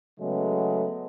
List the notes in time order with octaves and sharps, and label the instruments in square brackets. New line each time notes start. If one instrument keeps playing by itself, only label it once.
[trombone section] C#3 F#3 G#3 A3 B3